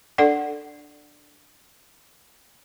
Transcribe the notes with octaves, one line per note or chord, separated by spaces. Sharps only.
D4 A4 D5 F#5